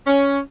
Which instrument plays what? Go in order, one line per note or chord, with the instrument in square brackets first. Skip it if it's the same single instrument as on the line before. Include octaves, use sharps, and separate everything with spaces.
[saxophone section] C#4